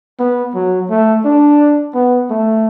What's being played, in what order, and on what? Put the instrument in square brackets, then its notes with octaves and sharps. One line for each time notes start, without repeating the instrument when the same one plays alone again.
[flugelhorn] B3
F#3
A3
D4
B3
A3